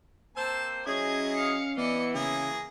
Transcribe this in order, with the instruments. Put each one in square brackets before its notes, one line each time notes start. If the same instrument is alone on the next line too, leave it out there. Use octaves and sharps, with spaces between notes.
[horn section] A#3 C4 C5 [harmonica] A5 [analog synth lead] E6
[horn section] F#3 E4 G#4 [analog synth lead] C#4 [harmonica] D#5 [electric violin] G#6
[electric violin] F5 C#7
[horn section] E3 [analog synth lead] B3 [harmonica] D5 [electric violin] D#5 C#7
[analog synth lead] C#3 [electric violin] A#3 A#6 [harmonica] G#4